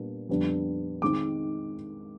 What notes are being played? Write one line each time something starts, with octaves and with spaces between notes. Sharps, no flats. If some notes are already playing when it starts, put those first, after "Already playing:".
Already playing: A#2 G3 B3 D4
F2 D3 G3 B3 D4
D#3 G#3 C4 D#4 D6